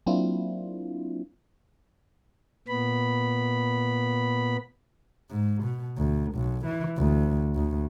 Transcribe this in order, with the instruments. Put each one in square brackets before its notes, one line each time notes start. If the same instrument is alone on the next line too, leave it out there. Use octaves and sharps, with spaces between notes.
[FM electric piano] F#3 A#3 C4 D4 E4 F4
[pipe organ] A#2 B3 B5
[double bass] G#2
B2
D2
B1
E3
D2
D2